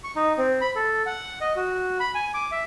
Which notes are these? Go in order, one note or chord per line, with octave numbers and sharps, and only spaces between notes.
C#6
D#4
C4
B5
A4
F#5
D#5
F#4
B5
G#5
D6
E5